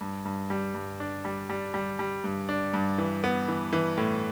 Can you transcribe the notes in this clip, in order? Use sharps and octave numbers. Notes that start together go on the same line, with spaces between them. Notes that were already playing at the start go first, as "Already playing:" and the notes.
G2
G2
G3
G2
D4
G3
G3
G3
G3
G2
D4
G2
E3
B3
E3
E3
A2